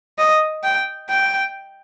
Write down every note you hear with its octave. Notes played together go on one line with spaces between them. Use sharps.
D#5
G5
G5